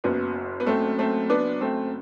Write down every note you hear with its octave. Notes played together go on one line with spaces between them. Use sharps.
F#1 F#2 F#3 B3
B3
A3 C4
A3 C4
B3 D4
A3 C4